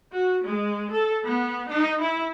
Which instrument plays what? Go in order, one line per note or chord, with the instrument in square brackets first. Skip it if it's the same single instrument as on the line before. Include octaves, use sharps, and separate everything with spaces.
[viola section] F#4
G#3
A4
B3
D#4
E4